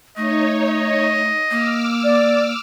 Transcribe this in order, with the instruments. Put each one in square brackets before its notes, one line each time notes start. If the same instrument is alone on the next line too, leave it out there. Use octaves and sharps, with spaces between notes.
[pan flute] A3 [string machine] D#4 C#5 [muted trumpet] D#5
[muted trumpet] D#5
[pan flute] A#3 [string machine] D6 E6 F6
[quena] D5